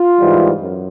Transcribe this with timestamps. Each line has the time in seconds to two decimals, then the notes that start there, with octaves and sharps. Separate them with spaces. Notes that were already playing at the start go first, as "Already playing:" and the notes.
Already playing: F4
0.20 G#2 E3 G3
0.60 F#2